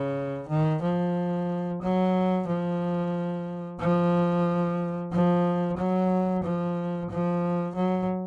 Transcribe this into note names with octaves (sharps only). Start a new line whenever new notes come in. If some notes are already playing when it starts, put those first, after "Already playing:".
Already playing: C#3
D#3
F3
F#3
F3
F3
F3
F#3
F3
F3
F#3